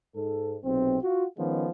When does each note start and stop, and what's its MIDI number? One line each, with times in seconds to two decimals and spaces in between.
0.16 0.56 44
0.16 0.56 69
0.64 0.97 35
0.64 0.97 48
0.64 0.97 60
1.02 1.25 65
1.02 1.25 66
1.37 1.68 51
1.37 1.68 53
1.37 1.68 56
1.37 1.68 59
1.37 1.68 61